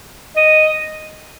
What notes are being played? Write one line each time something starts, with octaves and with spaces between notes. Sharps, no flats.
D#5